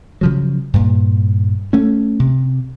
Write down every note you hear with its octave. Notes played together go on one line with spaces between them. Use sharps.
C#3 F3 F#3
G2 A#2
A3 C#4
C3